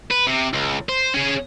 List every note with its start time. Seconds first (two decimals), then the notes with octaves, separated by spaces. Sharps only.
0.11 B4
0.27 C3
0.53 C#2
0.89 C5
1.14 C#4 G#4